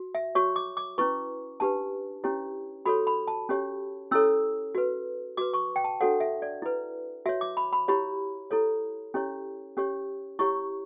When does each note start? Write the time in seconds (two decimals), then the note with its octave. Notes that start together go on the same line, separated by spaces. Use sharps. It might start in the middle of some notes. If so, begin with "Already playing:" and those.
Already playing: F#4
0.15 E5
0.35 F#4 C#5 C#6
0.56 D6
0.77 D6
0.98 C#4 E4 B4 C#6
1.60 D4 G4 B4 A5
2.24 C#4 E4 G4 C#5
2.86 F#4 A4 C#5 B5
3.07 B5
3.28 A5
3.49 C#4 G4 C#5
4.11 C#4 E4 A4 C#5 E6
4.75 F#4 B4
5.37 F#4 B4 D6
5.54 C#6
5.76 G5
5.84 A5
6.01 D4 F#4 A4 C#5 F#5
6.20 E5
6.42 D5
6.62 E4 B4
7.26 F#4 C#5 E5
7.41 D6
7.57 B5
7.73 B5
7.88 E4 G4 C#5 B5
8.51 E4 A4 C#5
9.14 C#4 E4 G4 C#5
9.77 C#4 G4 C#5
10.39 E4 G4 C#5 C#6